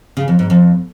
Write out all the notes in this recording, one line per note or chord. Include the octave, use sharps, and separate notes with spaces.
C#3
F2
G#2
F2